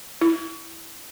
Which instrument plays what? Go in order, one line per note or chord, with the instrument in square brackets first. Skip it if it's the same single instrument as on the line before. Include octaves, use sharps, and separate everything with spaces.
[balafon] E4